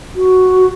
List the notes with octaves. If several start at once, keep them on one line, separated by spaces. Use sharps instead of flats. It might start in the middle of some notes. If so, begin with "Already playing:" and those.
F#4